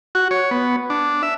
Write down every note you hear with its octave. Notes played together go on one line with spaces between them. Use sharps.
F#4
C#5
B3
D4
E5